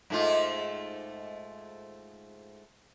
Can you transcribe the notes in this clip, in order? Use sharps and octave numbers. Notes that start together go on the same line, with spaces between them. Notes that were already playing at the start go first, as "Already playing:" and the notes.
G#2 A3 F4